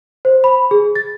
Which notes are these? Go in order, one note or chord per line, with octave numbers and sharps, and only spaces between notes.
C5
B5
G#4
A6